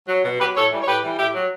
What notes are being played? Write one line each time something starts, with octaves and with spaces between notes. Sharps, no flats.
F#3
B2
F#3 G4 B4
A2 A4 C#5
E3 G3
C#5
A2 G4 B4
E3 G3
A2 E4 G4
F#3